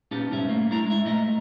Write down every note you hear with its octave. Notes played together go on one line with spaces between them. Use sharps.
A#2 B3 C#4 D#4 G4 A5
C#2 G2 C3 C#4 E5
A3 A#3
G2 D4 E4 A#5
G#3 E5
A#2 A3 D#5 E5 A#5